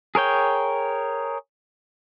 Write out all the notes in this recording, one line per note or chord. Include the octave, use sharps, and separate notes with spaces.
G#4 A#4 C#5 G5